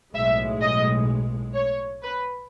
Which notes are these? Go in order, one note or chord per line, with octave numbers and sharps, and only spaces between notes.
B1 A2 G#3 E5
D#5
C#5
B4